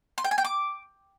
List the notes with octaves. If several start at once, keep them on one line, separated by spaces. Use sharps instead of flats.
C6
G5
G#5
G5
D6